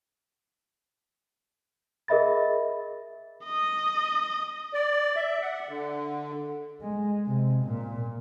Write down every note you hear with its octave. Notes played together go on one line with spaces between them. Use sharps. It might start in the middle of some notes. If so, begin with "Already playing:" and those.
G#4 A#4 D#5 E5 B5 A6
D#5
D5
E5
F#5
D3
G#3
C3
A#2